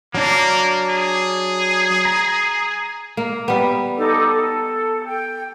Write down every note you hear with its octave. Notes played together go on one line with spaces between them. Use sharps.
F#3 A#3 D4
G#4
A#5
A#3
G3 B3
D#4 A4 D6
A4
G5